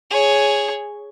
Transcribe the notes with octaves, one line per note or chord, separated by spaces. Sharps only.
G#4 C#5